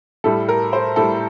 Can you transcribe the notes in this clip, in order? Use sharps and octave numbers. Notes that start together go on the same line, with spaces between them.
A2 G3 A4
A#4
C5
A2 G3 A4